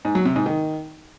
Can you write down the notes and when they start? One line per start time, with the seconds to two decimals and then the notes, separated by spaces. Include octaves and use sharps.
0.05 G#2
0.15 F#3
0.25 C3
0.36 G#2
0.46 D#3